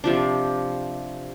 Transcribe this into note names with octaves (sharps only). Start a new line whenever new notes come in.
C3 F3 D4